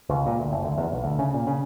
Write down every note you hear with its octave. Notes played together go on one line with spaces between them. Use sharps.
C#2
A#2
D2
F#1
D2
E2
B1
D2
C#3
A#2
C#3